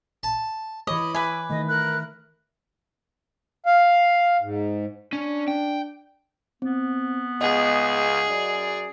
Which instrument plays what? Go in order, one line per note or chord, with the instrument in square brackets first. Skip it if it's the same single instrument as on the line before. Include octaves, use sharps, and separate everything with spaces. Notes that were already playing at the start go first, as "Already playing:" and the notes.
[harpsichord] A5
[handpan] E3 C#5 [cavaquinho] D#5 [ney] B5 [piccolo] D6
[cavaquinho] B4 G#5 [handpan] E5
[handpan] D#3 A3 [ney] D#5
[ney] A#4 [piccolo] F#6
[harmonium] F5
G#2
[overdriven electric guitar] C#4 [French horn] D4
[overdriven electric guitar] G5
[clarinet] B3 [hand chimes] C4
[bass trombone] C#2 [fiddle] G#4 [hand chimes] D#5 F#5
[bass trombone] F#2 [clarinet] D5